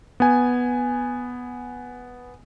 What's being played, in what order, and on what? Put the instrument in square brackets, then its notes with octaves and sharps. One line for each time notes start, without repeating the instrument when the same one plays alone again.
[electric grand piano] B3 G#5